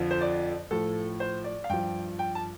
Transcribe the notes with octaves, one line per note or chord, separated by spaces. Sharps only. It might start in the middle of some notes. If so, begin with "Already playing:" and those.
Already playing: F2 D3 F3
C5
D5
A2 F3 A4
C5
D5
F5
G2 F3 G5
G5
A5